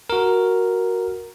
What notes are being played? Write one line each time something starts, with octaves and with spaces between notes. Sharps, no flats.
F#4 A#4